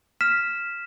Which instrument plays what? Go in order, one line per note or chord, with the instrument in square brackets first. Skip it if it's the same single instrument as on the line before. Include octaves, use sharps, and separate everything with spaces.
[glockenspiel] F6 B6 E7